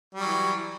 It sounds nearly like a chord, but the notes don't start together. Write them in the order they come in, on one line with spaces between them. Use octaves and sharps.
G3 F#3 E3